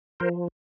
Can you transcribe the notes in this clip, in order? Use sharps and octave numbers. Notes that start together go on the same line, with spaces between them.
F3 A#4 C5